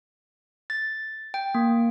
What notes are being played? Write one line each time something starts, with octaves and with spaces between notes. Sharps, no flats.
A6
G5
A#3